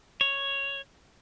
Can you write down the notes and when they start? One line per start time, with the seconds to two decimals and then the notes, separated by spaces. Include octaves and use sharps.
0.21 C#5